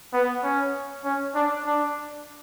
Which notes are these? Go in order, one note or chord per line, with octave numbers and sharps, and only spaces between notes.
B3
C#4
C#4
D4
D4